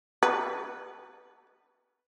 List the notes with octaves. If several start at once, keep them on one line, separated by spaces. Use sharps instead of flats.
B4